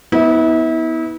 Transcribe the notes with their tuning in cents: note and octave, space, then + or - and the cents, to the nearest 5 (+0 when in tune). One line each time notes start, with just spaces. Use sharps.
B3 +0 E4 -35